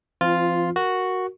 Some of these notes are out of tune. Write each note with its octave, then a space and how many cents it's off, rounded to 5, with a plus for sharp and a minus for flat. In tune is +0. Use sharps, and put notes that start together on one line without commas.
F3 -35 C4 +0 F4 +0
F#4 +0 A#4 +0